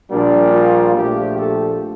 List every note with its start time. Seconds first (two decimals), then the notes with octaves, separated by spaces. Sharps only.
0.10 A#1 A#2 G3 A#3 D4
0.53 F4
0.96 A#1 A#2 F3 A3 G4
1.38 A4